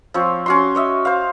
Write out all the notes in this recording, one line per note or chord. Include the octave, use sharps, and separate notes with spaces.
F3 C4 C#5
C#4 F#4 C6
C#5 D#5 E5
C5 F5